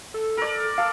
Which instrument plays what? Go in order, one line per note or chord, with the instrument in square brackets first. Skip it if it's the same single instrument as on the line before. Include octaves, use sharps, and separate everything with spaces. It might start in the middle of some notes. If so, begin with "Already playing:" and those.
[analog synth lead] A4
[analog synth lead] A4 [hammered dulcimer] A#4 D5
[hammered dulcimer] A4 [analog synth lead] F5